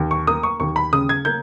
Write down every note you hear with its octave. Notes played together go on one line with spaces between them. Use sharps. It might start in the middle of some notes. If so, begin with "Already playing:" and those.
Already playing: D#2
C#6
A#3 D#6
C#6
D#2 C#6
B5
C#3 D#6
G#6
A#3 G6